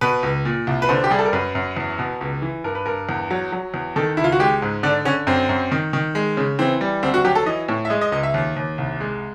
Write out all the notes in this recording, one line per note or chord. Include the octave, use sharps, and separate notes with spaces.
B2 B4
C#2
A#2
C2
B4
D3 C5
G4
G3 G#4
A4
A#4
F#2 B4
F#2
E2
B2
C#2
E3
G2 A#4
B4
G2 A#4
E2
F#3
F#3
E2
D#3 A4
C#2 E4
F4
F#4
G#3 G4
G#2
D3 D4
D3 C#4
F#2 C4
F#2
D#3
D#3
G#3
C#3
E3 C4
G3
D2 C4
F#4
F#3 G4
A4
E3 D#5
A2
E5
G#3 D#5
D#5
C#2 D#5
E5
D#2
D#2
C2
G#3